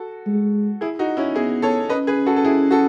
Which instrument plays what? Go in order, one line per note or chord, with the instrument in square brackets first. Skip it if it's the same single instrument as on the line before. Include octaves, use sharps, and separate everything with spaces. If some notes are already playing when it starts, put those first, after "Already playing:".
Already playing: [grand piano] F#4 A4
[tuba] G#3
[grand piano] E4 G#4
D#4 F#4
C#4 E4
[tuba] B3 [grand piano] E4 G#4
[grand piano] A4 C#5
[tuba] C#4 [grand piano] B4 D#5
[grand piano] G#4 B4
F#4 A4
A4
E4 G#4
F#4 A4